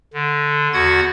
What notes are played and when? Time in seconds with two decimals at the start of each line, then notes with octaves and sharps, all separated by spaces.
0.14 D3
0.73 E2 F#4 F#5 G#6 A6